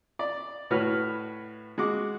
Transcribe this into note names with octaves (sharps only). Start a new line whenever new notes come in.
D5
A2 F#4 B4 C#5 F6
G#3 F#4 F#5 D6